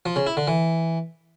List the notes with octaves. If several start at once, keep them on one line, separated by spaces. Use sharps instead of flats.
F3
C#3
E4
D3
E3